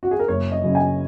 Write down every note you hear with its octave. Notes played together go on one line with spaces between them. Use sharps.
F#4
G#4
A#4
F#1 C#5
D#5
F#2 C#3
G#5